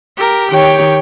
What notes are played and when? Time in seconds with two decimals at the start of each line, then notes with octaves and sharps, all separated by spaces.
0.16 G4 A#4
0.50 D#3 G4 C#5 G5